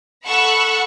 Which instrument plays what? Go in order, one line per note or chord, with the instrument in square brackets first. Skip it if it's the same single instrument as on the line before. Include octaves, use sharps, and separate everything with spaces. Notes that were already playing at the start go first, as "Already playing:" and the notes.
[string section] A4 F#5 B5 C#6 E6 F#6